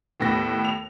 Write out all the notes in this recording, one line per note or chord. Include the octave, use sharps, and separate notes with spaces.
D#2 A2 B3 A#6
F7